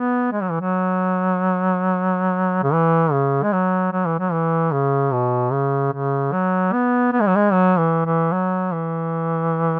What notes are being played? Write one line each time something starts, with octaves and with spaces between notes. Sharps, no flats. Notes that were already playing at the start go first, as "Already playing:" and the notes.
Already playing: B3
G#3
F#3
E3
F#3
C#3
E3
C#3
G#3
F#3
F#3
E3
F#3
E3
C#3
B2
C#3
C#3
F#3
B3
B3
G#3
F#3
G#3
F#3
E3
E3
F#3
E3